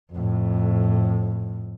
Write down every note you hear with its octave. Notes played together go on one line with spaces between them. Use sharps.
F2 A2